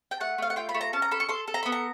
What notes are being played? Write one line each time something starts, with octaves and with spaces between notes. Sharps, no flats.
G5
A3 F#5
A3 F5
F#5
F4 G5
B5
A3
A#5
C#4 A5
A#5
A4 B5
C#6
A4 C6
A4
A#5
B3 B5
A#5